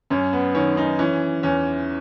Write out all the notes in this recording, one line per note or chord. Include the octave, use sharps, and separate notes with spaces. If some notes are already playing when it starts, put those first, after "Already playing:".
F#2 C#4
B3
D#3 C#4
D#4
E3 C#4
E2 C#4